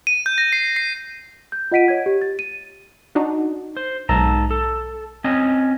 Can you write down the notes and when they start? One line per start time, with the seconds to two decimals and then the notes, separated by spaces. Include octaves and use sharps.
0.07 D#7
0.26 G6
0.38 A#6
0.53 C7
0.76 C7
1.52 G6
1.72 F4 D#5 F#5 B6 D7 D#7
1.88 C#5 G#6
2.06 G4
2.22 A6
2.39 D#7
3.15 D4 D#4 F#4
3.77 C5
4.09 B1 G#2 A4 A#5
4.51 A4
5.24 C4 C#4 D#5